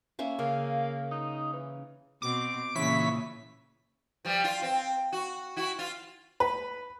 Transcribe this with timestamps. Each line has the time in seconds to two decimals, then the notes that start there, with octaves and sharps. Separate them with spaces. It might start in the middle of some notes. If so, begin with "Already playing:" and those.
0.19 A#3 C#4 E5
0.39 C#3 A#3
1.11 D#4
1.53 E3
2.22 B2 C4 D6
2.76 A#2 C#3 E3 C#4 B6
4.25 F3 G3
4.44 F4
4.62 C4
5.12 F#4
5.56 E4 F#4
5.79 F4
6.40 B4